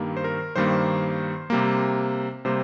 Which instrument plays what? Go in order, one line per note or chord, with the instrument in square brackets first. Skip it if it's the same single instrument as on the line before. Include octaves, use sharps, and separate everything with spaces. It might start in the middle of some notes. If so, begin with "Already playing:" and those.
Already playing: [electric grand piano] G2 D#3 G3 A#3
C5
A#4
G2 D#3 G3 A#3 C5
C3 G3 A#3
C3 G3 A#3 C5